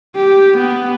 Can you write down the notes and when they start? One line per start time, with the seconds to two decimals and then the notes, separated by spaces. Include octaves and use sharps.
0.16 G4
0.58 B3